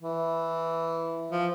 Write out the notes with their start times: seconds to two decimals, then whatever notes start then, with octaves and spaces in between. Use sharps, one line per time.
0.02 E3
1.31 F3